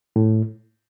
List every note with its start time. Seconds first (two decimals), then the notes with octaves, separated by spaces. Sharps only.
0.16 A2